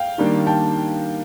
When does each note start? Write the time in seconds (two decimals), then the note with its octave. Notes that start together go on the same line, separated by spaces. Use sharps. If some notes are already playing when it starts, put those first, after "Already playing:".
Already playing: F5 G5
0.18 D#3 G3 A#3 D4
0.47 G5 A5